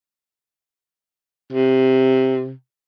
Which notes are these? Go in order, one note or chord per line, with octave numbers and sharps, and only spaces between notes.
C3